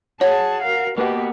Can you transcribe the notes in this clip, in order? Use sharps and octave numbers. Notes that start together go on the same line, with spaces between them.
F#4 G#4 C#5 A5
A#4 F5
B2 A#3 B3 F#4 G4